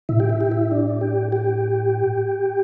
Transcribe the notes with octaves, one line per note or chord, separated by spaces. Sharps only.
A2 E4
G4
E4
G4
E4
D4
G4
G4